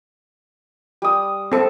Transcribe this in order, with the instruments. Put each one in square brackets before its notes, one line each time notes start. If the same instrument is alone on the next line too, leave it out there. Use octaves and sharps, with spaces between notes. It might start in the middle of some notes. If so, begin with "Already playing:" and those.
[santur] G3 D#6
[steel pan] C4 A4